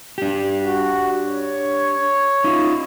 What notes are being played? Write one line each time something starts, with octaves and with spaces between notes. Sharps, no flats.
D4 G4
F#4
C#5
D#4 F4